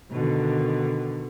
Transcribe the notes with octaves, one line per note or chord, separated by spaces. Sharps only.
B2 D3 D#3